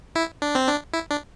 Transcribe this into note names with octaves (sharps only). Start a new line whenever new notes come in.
E4
D4
C4
D4
E4
D4